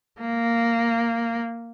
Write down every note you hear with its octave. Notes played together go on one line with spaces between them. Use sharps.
A#3